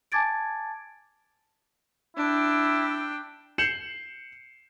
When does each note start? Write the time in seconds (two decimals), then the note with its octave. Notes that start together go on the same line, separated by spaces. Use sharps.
0.12 G#5 A5 D6 G#6 A6 D7
2.17 D4 E4 G5
3.58 G6 C7 C#7 E7 F#7